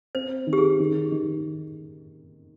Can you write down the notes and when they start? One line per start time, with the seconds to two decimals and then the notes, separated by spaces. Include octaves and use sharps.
0.15 C4 C5
0.47 D#3
0.53 G4
0.58 G#4
0.80 D#3
1.11 D#3